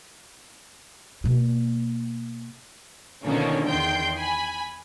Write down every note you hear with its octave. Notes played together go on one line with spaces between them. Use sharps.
B2 A#3
B2 D3 D#3 F3 A#3 C#4
E2 D#3 G5 C6 G6
G#5 B5